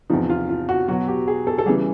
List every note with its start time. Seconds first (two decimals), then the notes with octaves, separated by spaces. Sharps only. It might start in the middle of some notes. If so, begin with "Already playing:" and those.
0.10 E2 C3 F3 D#4
0.30 F4
0.49 F4
0.69 F#4
0.88 B2 F#3 F#4
1.08 G4
1.28 G#4
1.47 A4
1.58 A4
1.66 C#3 E3 G3 G#4